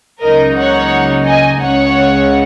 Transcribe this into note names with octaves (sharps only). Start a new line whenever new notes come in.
C#2 C#3 F#3 A#3 D#4 A#4 D#5
C#5 F#5
D#5 G#5
C#2 C#3 G#3 C#5 F#5